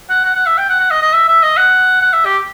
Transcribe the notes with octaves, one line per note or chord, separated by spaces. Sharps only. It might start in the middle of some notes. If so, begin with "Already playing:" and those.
F#5
F#5
F#5
E5
G5
F#5
F#5
D#5
D#5
E5
E5
D#5
F#5
F#5
E5
G4